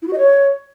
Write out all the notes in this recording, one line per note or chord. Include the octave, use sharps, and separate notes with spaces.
E4
F#4
D#5
C#5